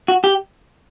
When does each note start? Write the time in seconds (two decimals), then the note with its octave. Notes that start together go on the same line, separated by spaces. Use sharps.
0.08 F#4
0.24 G4